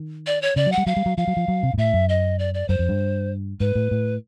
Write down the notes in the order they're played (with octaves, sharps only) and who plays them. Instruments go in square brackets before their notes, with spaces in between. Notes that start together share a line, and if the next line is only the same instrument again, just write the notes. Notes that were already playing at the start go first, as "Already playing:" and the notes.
Already playing: [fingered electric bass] D#3
[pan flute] D5
C#5
[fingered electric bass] C#3 [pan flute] D5
[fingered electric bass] F#3
[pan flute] F#5
[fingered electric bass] G3
[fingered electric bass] F#3 [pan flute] F5
[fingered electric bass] G3
F#3
[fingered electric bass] F3 [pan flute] F5
[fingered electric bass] F#3
F3
F#3
C3
G#2
[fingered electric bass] A2 [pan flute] E5
[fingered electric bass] F#2
[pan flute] D#5
D5
D5
[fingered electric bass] F#2 [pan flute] C5
[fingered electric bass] F2
G2
[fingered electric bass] G#2 [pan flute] B4
[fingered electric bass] A2
A2